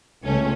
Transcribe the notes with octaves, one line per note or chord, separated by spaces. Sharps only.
C#2 A3 C#4